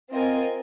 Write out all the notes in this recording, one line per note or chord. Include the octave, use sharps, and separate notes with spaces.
C4 F4 A#4 D#5 G#5